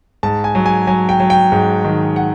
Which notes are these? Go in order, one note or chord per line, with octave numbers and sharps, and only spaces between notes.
G#2 A5
G#5
F#3
G#5
F#3 G#5
G5
F#3
G5
G#2
D#3
F#5